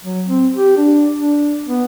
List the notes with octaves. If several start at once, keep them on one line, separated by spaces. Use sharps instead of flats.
F#3
C4
G4
D4
D4
B3